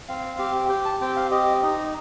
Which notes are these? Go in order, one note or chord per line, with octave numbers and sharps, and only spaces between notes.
C4 F5
G4
G4 G5
A5
C4 G5
F5
G4 D#5
D#4 D#5